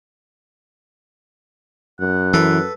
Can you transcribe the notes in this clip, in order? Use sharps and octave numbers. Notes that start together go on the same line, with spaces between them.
F#2 F#5
E3 A4 B4